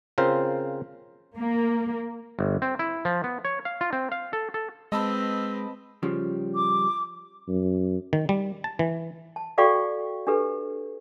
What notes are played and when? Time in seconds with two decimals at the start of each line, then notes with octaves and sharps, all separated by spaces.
0.18 C#3 C4 F4 A#4 C5
1.36 A#3
2.39 G1
2.62 C4
2.79 E4
3.05 F3
3.24 B3
3.45 C#5
3.65 F5
3.81 F4
3.93 C4
4.12 F5
4.33 A4
4.54 A4
4.92 G#3 C4 B4 D#5 A5 B5 E6
6.03 C#3 F3 G3
6.55 D6
7.49 F#2
8.13 D#3
8.29 G3
8.64 A5
8.79 E3
9.36 A5
9.58 F#4 A4 D5 F5 G5 C#6
10.27 D4 G4 A4 B4